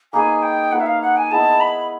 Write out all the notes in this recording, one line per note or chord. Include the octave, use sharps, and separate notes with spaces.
A#3 D#4 G#4 B4 G#5
G5
A#3 D#4 G#4 B4 F#5
E5
F5
F#5
G#5
G#3 B3 E4 G#4 A5
B5